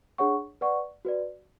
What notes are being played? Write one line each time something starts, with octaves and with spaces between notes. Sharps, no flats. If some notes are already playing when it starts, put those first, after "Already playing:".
D4 G#4 C#5 F#5 C#6
B4 D5 F#5 C#6
F#4 B4 D5